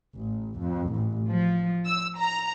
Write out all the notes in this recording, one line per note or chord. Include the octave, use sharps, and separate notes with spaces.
A1
F2
A1
F3
E6
A#5